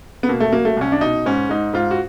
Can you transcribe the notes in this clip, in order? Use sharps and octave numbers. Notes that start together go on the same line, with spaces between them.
B3
B2 A#3
A3
F#3 A#3
A3
C2 C#4
D4
B2 D#4
G#2 C#4
G#2 D#4
G#2 F4
F#4